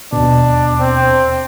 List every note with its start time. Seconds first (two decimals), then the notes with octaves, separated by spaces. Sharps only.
0.13 D#2 B2 D4
0.80 C4